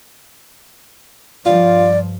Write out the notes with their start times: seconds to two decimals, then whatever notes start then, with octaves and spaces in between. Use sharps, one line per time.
1.45 G2 F3 F4 D5